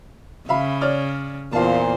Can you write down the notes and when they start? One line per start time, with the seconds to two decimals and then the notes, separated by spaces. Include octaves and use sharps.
0.49 C#3 E5 F5 B5
0.81 C#5 D5 F6
1.53 E2 A#2 C5 F5 A5